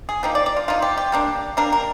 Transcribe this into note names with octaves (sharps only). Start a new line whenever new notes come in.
G#4
F3 A#3 D#4 G4
D5
D5
F4
F3 A#3 D#4 F4
G4
G4
G3 A#3 D4
G3 A#3 D4 A#4
A#4